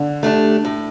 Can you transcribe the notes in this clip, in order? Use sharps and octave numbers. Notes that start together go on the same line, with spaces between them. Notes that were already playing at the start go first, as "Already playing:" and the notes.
Already playing: D3
A3 D4 G4
A2